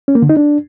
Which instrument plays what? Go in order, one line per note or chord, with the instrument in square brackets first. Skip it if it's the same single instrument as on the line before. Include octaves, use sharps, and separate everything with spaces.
[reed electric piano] C#4
A#3
D3
D#4
D4